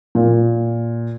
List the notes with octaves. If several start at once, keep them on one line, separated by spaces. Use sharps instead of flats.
A#2